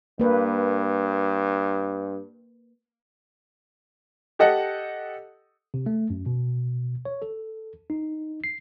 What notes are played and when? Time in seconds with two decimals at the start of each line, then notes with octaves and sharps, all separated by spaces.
0.20 G2 A#3 B4
4.39 G4 A4 D#5 F#5
5.74 C3
5.86 A3
6.10 F#2
6.26 B2
7.05 C#5
7.22 A4
7.90 D#4
8.44 C7